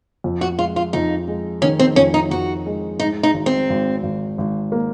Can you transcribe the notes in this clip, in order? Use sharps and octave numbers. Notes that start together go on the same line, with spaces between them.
F2
F#4
G#3 F4
F4
F2 D#4
G#3
D#3 C#4
C4
F2 C#4
D#4
F2 F#4
G#3
G#2 D#4
D#4
G#1
C4
G#1
G#1
G#1
A#3